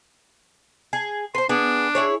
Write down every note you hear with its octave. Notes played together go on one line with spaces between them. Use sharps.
G#4
B4 C5 C6
B3 D4 G#4
E4 G#4 C#5